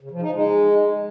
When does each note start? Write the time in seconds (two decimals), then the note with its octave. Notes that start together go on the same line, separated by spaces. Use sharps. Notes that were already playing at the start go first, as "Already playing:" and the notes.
0.01 C#3
0.11 F3
0.21 D#4
0.32 G#3